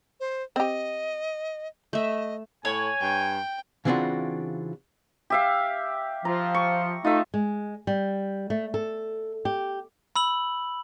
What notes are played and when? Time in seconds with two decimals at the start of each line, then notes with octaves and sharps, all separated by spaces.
0.20 C5
0.56 C4 G4 D#5
1.93 A3 D#5 E5
2.65 A2 C#5 G#5
3.01 G2 G5
3.85 C#3 E3 C4 D4 F4 F#4
5.30 G4 E5 F5
6.25 F3 A#5
6.54 C#6
7.05 A3 D#4 F4 E5
7.34 G#3
7.87 G3
8.50 A3
8.74 A4
9.45 G4
10.16 B5 E6 F#7